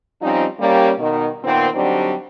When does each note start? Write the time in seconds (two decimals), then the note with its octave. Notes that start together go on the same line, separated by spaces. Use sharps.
0.22 F3 G3 C4 C#4 D#4
0.60 G3 A#3 C#4
0.99 B2 D#3
1.44 A#2 D#3 B3 C4
1.74 D3 F#3 G3 C4 D4 D#4